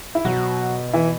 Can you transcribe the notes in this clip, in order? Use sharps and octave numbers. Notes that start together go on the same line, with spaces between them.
E4
B2 F#3 F#4
E3 E4